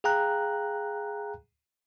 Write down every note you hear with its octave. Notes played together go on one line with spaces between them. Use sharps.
G#4 F5 G5 A#5 F#6